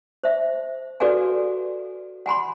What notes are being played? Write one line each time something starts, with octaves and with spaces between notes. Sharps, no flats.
C5 E5
F#4 A4 B4 D5 F5 G#5
F#5 G#5 B5 C6